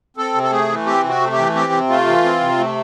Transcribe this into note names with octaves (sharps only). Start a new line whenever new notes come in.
C4 A4
C3
A4
A3 G#4
E3
C4 G4
C3
F#4
A3
G4
E3
C4 G4
C3
A3 F4
E3
C4
C3
A3